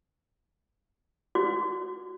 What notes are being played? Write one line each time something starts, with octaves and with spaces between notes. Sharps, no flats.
F#4